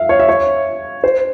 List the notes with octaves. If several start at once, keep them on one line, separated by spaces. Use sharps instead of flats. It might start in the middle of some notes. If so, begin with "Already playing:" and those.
Already playing: E5 F5
C#5
E5
C#5
C5